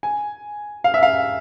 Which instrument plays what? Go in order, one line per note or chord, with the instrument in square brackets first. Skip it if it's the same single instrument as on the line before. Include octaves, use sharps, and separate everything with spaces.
[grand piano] G#5
F5
E5
F5